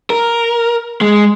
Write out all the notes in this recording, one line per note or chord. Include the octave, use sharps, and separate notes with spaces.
A#4
G#3